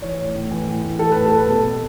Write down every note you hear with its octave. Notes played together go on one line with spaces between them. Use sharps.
E3 C#5
A2
A2
E3
A2
A2
E3 A4
A2 B4
A4
A2
B4
B2 A4
B2